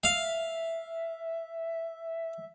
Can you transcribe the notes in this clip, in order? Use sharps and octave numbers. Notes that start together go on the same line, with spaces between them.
E5 F5